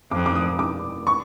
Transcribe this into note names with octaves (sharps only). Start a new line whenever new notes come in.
F2 D6
D6
D#6
D6
C#6